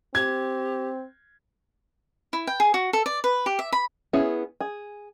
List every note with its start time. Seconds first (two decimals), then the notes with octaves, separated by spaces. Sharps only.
0.15 C4 G4 G#6
2.33 E4
2.47 G5
2.60 G#4
2.74 F#4
2.93 A4
3.06 D5
3.24 B4
3.46 G4
3.59 E5
3.72 B5
4.13 B3 C#4 E4 G#4 C#5
4.61 G#4